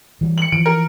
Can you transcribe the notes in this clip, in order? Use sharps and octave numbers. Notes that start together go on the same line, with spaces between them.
E3 G3
C#7 F#7
E3 F3 D7
A#4